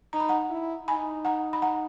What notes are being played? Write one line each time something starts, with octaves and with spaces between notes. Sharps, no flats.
D#4 A#5
B5
F#5 A#5
E4
D#4 G#5 B5
F#5 A#5
B5
F#5 A#5